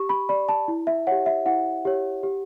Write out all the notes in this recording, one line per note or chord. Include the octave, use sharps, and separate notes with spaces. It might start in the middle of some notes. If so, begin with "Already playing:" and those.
Already playing: G4 C#6
B5
D5 B5
A5
E4
E5
G4 C#5 F#5
E5
E4 F#5
G4 C#5
G4